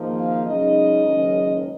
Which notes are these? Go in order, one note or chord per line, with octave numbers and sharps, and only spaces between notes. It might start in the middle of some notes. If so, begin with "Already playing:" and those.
Already playing: G#1 G#2 F3 A#3 D#4
F5
F#2 C#3 G#3 D#4 D#5
F#1 F#2 D#3 G#3 C#4